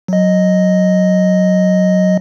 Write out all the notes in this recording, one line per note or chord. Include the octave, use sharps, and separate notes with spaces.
F#3 D#5